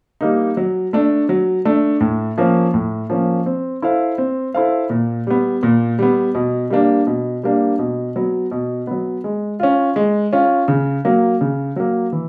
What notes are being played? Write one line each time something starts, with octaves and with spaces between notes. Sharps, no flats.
G3 A#3 D#4
F#3
A3 D4
F#3
A3 D4
A2
F3 A#3 C#4
A2
F3 A#3 C#4
C4
E4 A4 C5 F5
C4
E4 A4 C5 F5
A#2
G3 B3
A#2
G3 B3
B2
G3 A#3 D4
B2
G3 A#3 D4
B2
F#3 B3
B2
F#3 B3
G#3
C#4 F4
G#3
C#4 F4
C#3
F#3 A#3
C#3
F#3 A#3
E3